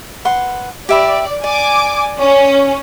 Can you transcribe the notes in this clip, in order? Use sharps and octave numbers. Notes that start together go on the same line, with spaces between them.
B4 F#5 C6
G4 D5 E5 B5
D5 G#5 D6
C#4